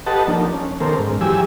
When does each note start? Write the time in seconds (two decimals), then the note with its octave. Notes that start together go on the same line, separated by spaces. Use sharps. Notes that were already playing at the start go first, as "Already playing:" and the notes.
0.06 G4 A4 B4 D#5 F#5 A5
0.27 F3 A#3 D4 D#4
0.53 C#4
0.81 D#3 B3 C#4 A4 A#4 C5
0.99 G#2
1.21 E3 F#3 G4 G#5 E6